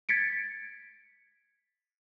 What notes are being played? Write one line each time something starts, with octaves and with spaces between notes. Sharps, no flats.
G#6 A6 B6 C#7 D7